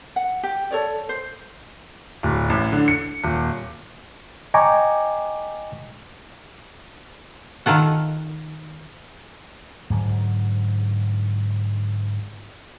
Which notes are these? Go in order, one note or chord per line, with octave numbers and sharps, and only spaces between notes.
F#5
G4
A4 C#5 D5
C5
D1
A1
D3
C#7
D#1
D#5 G5 G#5 A#5 C#6 D6
D#3 F4 A4 F#5
G#2 D3 F#3